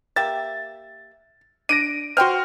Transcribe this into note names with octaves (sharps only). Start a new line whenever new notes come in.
A#3 G4 E5 A6
D4 A#6 D7 D#7
F#4 C5 G5 C6 F6